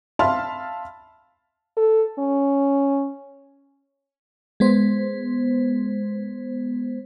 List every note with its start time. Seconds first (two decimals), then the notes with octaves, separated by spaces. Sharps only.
0.19 E5 F5 A5 B5 C6 F6
1.77 A4
2.19 C#4
4.60 G#3 B3 C5